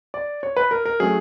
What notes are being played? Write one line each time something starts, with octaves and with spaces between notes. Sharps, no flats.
D5
C#5
B4
A#4
A#4
F#3 A3 C#4 G#4